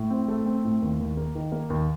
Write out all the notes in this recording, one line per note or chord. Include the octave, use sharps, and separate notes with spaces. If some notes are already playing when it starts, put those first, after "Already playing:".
Already playing: A2
C4
A3
C4
A2
D#2
D#2
A#3
D#3
A#3
D#2